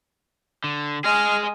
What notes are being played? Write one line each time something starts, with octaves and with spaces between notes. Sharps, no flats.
D3
G#3 G#4 D#5 F6